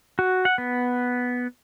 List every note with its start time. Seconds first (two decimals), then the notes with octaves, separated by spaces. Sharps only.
0.19 F#4
0.45 F#5
0.58 B3